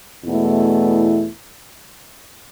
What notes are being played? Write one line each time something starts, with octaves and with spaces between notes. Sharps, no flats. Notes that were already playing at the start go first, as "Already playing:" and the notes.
E2 B2 A3 E4